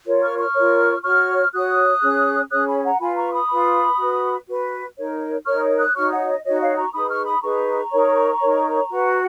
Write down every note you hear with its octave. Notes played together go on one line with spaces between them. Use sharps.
F4 A#4 C#5
C#6 F6
C#6 F6
F4 A#4 C#5
F#4 C#5 C#6 F6
F#4 C#5 D#6 F#6
C#4 G#4 C#5
C#4 G#4 C#5 D#6 F#6
G#5 B5
F#5 A#5
F4 B4 G#5 B5
A#5 C#6
B5 D#6
F4 B4
F#4 B4
F#4 B4
D#4 A#4 C#5
D#4 A#4 C#5 C#6 F6
D#6 F#6
D#4 F#4 C#5 C#6 F6
D#5 F#5
D#5
D#4 F#4 C#5 D#5
C#5 F5
A#5 C#6
D#4 G#4 B4 B5 D#6
C#6 F6
B5 D#6
D#4 G#4 B4 A#5 C#6
D#4 A#4 C#5
D#4 A#4 C#5
F#4 B4